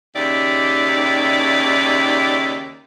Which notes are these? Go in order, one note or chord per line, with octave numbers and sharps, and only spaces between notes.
D#2 C#3 D#4 G4 D5 E5